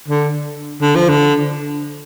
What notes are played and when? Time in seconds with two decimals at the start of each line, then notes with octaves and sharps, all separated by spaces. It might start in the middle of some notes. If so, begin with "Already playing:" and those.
0.08 D3
0.81 D3
0.95 F3
1.09 D3